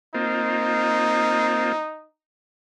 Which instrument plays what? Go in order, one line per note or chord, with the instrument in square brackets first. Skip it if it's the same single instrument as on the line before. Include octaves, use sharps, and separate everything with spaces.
[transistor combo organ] A#3 C4 F4 [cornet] D#4